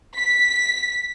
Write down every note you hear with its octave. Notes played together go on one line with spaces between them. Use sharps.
B6